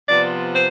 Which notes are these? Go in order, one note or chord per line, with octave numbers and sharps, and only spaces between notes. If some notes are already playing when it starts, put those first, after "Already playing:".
C3 F3 B3 D5
C5